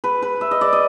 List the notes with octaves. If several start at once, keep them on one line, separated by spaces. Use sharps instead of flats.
B4
B4
E5
D#5
D5
D#5